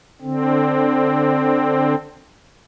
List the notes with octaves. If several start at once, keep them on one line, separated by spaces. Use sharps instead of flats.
D3 C4